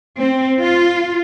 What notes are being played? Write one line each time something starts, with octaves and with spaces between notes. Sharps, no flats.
C4
F4